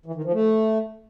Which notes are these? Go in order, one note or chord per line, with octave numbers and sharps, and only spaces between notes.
E3
D#3
F3
A3